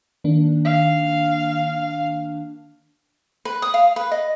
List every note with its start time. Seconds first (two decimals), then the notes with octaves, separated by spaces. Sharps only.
0.24 D#3 A#3 D4
0.65 F5
3.45 B4
3.62 D#6
3.74 F5
3.96 B4
4.12 D#5